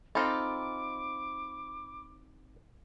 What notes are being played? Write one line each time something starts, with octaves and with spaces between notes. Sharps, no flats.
C4 D#4 F4 A4 B5 D6